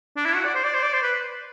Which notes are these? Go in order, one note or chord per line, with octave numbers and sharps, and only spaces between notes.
D4
E4
F#4
D5
C5
D5
C5
D5
C5
B4